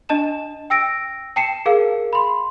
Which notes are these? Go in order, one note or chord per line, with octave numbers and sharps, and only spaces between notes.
D4 D#5 A5 E7
G5 E6 A#6 D7
G5 A5 C7 C#7 E7
G#4 A#4 F5
B5 C6